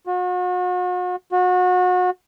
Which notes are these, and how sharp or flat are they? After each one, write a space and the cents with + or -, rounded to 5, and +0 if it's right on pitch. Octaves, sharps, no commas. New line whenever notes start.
F#4 -40
F#4 -30